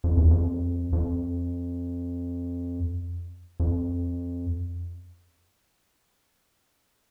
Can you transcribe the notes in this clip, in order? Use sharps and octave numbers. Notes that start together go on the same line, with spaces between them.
F2
E2
F2
F2
F2